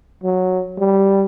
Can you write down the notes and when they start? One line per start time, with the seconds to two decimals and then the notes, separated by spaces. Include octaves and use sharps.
0.24 F#3
0.79 G3